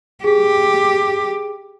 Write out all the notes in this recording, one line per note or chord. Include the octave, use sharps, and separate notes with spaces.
G4 G#4